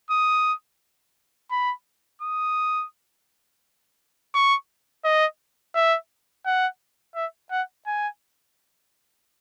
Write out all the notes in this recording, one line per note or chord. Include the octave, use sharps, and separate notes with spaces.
D#6
B5
D#6
C#6
D#5
E5
F#5
E5
F#5
G#5